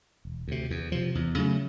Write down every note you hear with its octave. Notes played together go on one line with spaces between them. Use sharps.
E1
D2 C3
E2
C3 F3
E2
C#3 F#3 A3